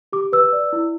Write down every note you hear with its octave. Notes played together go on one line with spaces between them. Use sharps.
G4 D6
B4 E6
D5
E4